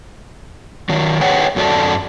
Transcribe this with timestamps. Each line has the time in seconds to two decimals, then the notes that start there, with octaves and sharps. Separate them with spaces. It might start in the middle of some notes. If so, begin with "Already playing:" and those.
0.89 D#3 F#3
1.21 G#4 B4 C#5 F#5 G5
1.56 F#2 F#3 F#4 A4 D5 A5